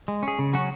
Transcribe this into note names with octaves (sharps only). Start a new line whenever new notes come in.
G#3
C#4 G#4
C#3
F#3 C#4 F#4